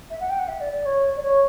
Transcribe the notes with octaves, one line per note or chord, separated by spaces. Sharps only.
E5
F#5
G5
F#5
E5
D5
D5
C#5
D5
C#5